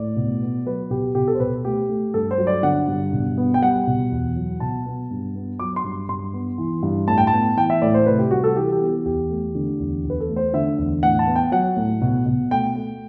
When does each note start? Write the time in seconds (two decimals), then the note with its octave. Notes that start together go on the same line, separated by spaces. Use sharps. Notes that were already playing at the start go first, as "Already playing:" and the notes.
Already playing: A2 D5
0.16 B2
0.42 B3
0.66 F#3 B4
0.90 B2 G4
1.15 B2 G4
1.28 A4
1.35 C5
1.40 B2 B4
1.65 A3 G4
1.89 A3
2.14 G2 A4
2.31 C5
2.38 F#3
2.47 D5
2.63 D3 F#5
2.88 G2
3.13 B2
3.38 B3
3.54 G5
3.62 G3 F#5
3.87 B2
4.11 E2
4.36 F#3
4.60 B2 A5
4.86 B3
5.11 G2
5.35 B3
5.60 F#3 D6
5.76 C6
5.84 G2
6.09 G2 C6
6.34 B3
6.58 E3
6.83 G2
7.08 A2 A5
7.18 G5
7.27 A5
7.32 B3
7.57 E3 G5
7.70 E5
7.82 A2 D5
7.94 C5
8.06 C3 B4
8.19 G4
8.31 G3 F#4
8.44 A4
8.56 E3 G4
8.73 G4
8.80 B3
8.89 G4
9.05 E2 G4
9.30 A3
9.55 D3
9.79 E2
10.04 E2
10.10 B4
10.20 A4
10.29 A3
10.36 C5
10.53 D3 E5
10.79 E2
11.03 A2 F#5
11.19 A5
11.27 B3
11.36 G5
11.52 F#3 F#5
11.77 A2
12.01 B2
12.26 B2
12.51 A3 G5
12.76 A3